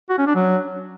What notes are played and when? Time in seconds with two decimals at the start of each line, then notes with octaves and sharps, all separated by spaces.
0.10 F#4
0.18 C#4
0.27 D4
0.35 F#3